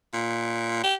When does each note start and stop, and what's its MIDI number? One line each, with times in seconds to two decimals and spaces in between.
0.14 0.81 46
0.84 0.94 67